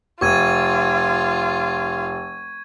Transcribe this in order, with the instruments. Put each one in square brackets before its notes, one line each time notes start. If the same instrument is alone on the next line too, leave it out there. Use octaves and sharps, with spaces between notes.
[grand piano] F1 [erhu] F4 [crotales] C#6 G#6 D#7